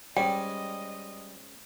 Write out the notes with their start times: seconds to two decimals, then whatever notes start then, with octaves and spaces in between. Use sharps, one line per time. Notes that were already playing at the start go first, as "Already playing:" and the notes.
0.17 G#2 G3 C#4 D5 D#5 G5